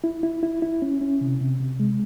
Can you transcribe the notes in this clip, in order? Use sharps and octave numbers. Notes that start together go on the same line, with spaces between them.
E4
E4
E4
E4
C#4
C#4
C3
C3
C3
G#3